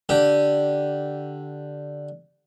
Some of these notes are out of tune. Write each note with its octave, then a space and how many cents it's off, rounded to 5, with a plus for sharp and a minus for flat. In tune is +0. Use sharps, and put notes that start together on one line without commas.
D3 +0 G4 -15